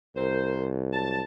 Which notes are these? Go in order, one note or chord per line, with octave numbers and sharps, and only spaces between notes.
C2 A#4 C5
F#3 A5